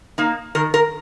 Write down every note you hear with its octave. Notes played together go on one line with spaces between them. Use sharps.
A#3 D#4
D#3 A#4
A#4